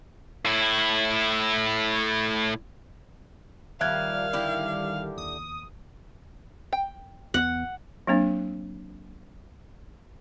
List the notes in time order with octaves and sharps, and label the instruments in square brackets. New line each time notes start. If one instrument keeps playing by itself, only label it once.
[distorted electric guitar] A2 E4
[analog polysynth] D#3 G3 [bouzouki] F3 A#3 [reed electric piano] E5 F#6 G#6 [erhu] F5
[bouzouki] D3 E4 G4
[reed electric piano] D#2 [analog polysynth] D#6
[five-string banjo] G5
[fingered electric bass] E2 B3 [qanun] F#5
[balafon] F#3 A#3 C4 D4